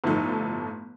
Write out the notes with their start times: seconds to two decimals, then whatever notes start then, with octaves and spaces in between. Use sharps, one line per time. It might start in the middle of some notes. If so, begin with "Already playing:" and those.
0.04 G1 A2 F3 D#4 A4